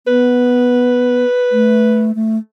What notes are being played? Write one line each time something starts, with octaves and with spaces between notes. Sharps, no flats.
B3 B4
A3
A3